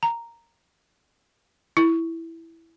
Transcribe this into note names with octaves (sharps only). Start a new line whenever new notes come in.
A#5
E4